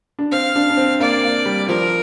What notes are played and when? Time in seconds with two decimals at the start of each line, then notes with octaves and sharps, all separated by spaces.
0.19 D4
0.32 C4 F5
0.56 D4
0.70 D4
0.77 C4
1.00 A#3 D5
1.24 A#3
1.46 G3
1.68 F3 A#4